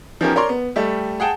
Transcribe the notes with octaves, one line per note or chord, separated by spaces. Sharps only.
F3 B3 C#4 D#4 G4 A#4
A#4 C#5 D5 C6
B3
G3 A3 A4
G#4 F#5 G5 A5